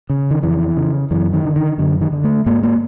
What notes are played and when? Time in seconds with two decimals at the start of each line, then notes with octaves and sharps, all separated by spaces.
0.10 C#3
0.31 D#3
0.43 F2 E3
0.77 C#3
1.11 F#2 E3
1.33 D#3
1.45 D3
1.56 D#3
1.78 F#2 D3
2.01 D#3
2.12 D3
2.24 A3
2.46 G#2 A#3
2.63 A#3